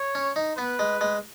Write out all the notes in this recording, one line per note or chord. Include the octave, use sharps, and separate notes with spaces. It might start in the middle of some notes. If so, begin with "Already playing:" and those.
Already playing: C#5
C#4
D#4
B3 B4
G#3
G#3